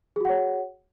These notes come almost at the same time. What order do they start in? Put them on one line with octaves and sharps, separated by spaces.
G#4 F#4 F#5 C#5